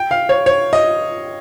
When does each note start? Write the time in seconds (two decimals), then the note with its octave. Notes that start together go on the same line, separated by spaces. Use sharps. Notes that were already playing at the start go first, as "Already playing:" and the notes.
Already playing: G5
0.11 F5
0.29 C#5
0.46 C#5
0.73 D#5